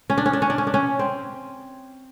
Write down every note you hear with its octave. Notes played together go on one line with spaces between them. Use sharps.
C#4
D4
C#4
D4
C#4
D4
C#4
D4
C#4
C4